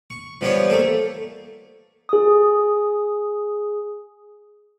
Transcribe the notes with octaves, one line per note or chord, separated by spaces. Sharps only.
C#6
F3 G3 B3 G4 C5 C#5
A3 A#3 A4
G#4 D#6